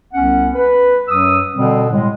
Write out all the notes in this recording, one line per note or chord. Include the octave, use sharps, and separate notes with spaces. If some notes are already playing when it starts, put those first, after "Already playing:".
C2 B3 C#4 F#5
B4
F#2 F#3 D#6 E6
B2 D3 G3 C4
A2 G3 G#3